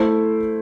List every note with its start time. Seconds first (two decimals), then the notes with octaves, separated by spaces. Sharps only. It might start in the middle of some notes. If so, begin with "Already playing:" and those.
Already playing: A3 E4 A4 C5